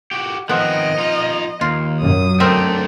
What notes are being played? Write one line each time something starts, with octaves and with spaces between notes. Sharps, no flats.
F#4 G4
D#3 F3 B3 C4 D#5
D#4 F4
D#2 F4
F#2 D#6
A3 C4 D4 A#4 E5